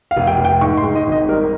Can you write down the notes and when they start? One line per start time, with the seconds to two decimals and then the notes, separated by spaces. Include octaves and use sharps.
0.11 F5
0.16 F1
0.27 G5
0.38 F1
0.45 G5
0.61 G#2 C#6
0.77 C6
0.84 G#2
0.95 D#5
1.07 G#1 D#5
1.28 G3 A#4